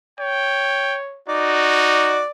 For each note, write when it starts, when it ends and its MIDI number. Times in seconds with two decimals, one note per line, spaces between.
0.20 1.20 73
0.20 0.98 79
1.28 2.22 63
1.28 2.25 66
1.28 2.31 74